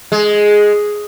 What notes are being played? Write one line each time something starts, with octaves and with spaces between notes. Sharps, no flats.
G#3